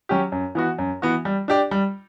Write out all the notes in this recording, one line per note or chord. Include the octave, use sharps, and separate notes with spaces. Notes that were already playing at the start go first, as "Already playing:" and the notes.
F#3 C#4 G4
F#2
E3 B3 F#4
F#2
E3 B3 F#4
G3
D4 G4 D5
G3